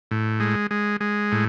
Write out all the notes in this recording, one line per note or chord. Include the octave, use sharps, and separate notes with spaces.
A2
G#3
G#3
G#3
A2